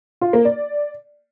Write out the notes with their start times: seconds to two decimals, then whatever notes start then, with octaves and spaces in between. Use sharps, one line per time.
0.21 F4
0.33 A#3
0.45 D5